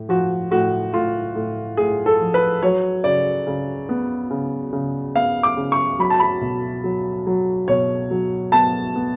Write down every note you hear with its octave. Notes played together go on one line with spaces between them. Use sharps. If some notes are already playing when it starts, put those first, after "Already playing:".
Already playing: A2
F3 F#4
A2 F#4
A2 F4
A2
A2 G#4
A4
F3
B4
F#3 C#5
C#3 D5
C#3
B3
C#3
C#3
B3 F5
D6
C#3
C#6
F#3 B5
A5
B5
B2
F#3
F#3
B2 C#5
F#3
B3 A5
B3